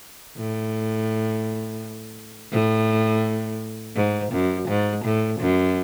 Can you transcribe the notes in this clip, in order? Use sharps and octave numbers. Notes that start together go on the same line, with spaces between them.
A2
A2
G#2
F#2
G#2
A2
F#2